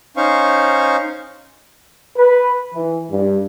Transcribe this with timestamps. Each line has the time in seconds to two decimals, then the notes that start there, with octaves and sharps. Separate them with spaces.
0.17 C#4 D#4 C5 F5 C#6
2.17 B4
2.74 E3
3.11 G2